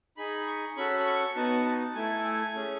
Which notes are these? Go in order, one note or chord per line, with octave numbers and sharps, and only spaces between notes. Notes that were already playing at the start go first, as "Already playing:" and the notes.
D#4 G#4 B5
C#6
C#4 F#4 A4 B5
B5
C#6
B3 D#4 F#4 A5
A5
A3 E4 A4 G#5
G#5
A3 C#4 G#4